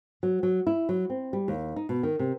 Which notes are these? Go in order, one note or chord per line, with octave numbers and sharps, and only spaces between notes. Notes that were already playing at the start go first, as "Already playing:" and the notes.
F#3
F#3
E4
F#3
C4
G3
D#2
D#4
B2
D#3
C3